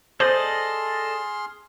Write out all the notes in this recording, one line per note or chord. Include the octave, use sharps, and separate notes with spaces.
G#4 A4 C5 D5 D#5 C6 F6